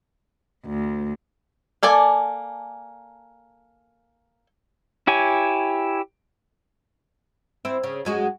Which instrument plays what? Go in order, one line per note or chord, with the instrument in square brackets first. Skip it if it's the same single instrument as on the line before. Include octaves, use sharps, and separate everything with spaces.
[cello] D2
[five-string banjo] A#3 A4 D5 G#5 A5
[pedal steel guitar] E4 G4 C#5 G#5
[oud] C4 E4
C#3
F#2 G#3 F#4